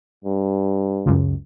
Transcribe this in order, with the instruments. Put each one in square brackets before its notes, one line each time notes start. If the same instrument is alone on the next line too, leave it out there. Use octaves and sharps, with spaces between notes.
[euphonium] G2
[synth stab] C#2 F#2